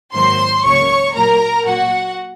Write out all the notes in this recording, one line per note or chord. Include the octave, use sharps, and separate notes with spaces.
G#2 D#3 F#3 A#3 C5 C6
C#2 C#3 F#3 A#3 C#5 C#6
A#2 F#3 A#3 A#4 A#5
A#2 F#3 A#3 F#4 F#5